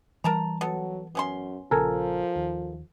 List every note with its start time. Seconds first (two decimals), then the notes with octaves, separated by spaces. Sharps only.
0.24 E3 G3 A#4 A5 A#5
0.61 F#3 B3 A4
1.15 F#2 B3 C#4 C6
1.71 A#1 C#3 F3 A4 A#4 G#5
2.36 D#2